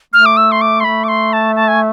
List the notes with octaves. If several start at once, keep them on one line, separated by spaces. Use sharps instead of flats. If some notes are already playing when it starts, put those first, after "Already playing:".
A3 F6
D6
E6
C6
D6
C6
A3 B5
D6
C6
A5
A5
G#5